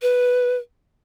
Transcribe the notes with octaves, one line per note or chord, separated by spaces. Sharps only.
B4